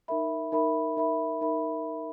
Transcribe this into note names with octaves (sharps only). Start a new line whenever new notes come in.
D#4 A#4 E5 B5
D#4 A#4 E5 B5
D#4 A#4 E5 B5
D#4 A#4 E5 B5